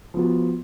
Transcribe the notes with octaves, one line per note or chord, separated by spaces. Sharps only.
F3 B3 F#4